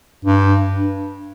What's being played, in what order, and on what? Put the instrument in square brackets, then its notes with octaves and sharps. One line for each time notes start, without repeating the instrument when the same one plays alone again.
[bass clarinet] G2